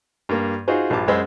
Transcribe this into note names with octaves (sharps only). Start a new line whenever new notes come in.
G2 A#3
D#4 F4 F#4 G#4 C5
A#1 G2 F4 A5 D6
F#2 G#3 C5 B5 E6